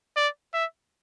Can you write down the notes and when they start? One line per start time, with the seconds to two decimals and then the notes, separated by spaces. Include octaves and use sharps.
0.17 D5
0.54 E5